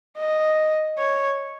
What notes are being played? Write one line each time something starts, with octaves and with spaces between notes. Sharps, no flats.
D#5
C#5